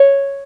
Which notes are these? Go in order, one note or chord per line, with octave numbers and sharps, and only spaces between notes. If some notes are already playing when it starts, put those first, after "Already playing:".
Already playing: C#5